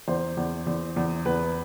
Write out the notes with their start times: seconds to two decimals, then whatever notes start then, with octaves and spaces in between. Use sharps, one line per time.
0.08 E2 C5
0.37 E2
0.67 E2
0.96 E2
1.26 E2 B4